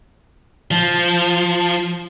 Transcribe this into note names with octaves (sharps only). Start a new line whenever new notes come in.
F3